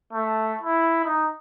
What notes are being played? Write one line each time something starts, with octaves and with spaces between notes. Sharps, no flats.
A3
E4
D#4